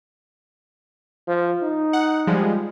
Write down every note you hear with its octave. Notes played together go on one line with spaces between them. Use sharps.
F3
D#4
F#5
F3 G3 G#3